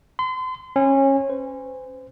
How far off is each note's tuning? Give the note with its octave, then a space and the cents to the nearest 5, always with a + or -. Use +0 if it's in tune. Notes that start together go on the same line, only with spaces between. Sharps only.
C6 -35
C#4 -25
C5 -35